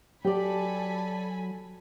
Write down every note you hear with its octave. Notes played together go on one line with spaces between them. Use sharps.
F#3 G4 A4 D5 G#5 B5